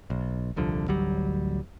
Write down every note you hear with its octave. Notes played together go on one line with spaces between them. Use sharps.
B1
D#1 C2 D3 F3
A1 D2 F#3 G3